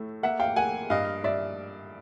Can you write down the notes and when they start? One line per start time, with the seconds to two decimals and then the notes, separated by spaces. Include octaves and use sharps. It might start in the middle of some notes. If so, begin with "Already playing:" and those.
Already playing: A2 A3
0.23 A#3 E5 F#5
0.40 F5 G5
0.56 A#3 F#5 G#5
0.90 G2 D#5 F5
1.24 G2 D5 E5